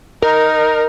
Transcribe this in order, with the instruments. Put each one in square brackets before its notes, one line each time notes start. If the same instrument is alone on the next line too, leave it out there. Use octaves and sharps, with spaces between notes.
[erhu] D#4 [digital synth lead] A#4